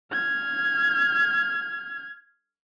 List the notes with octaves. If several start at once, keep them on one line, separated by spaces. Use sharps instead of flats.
F6 G#6